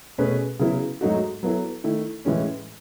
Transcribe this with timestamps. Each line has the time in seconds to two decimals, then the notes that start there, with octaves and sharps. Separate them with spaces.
0.18 B2 A3 C#4 G#4 B4
0.59 C#3 F#3 B3 E4
1.01 G#2 F#3 A3 D#4 F#4
1.43 F#3 B3 E4 A4
1.84 D#3 A3 E4
2.25 A2 E3 G#3 C#4